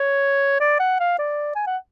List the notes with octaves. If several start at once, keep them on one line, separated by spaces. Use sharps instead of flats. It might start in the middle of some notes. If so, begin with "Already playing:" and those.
Already playing: C#5
D5
F#5
F5
D5
G#5
F#5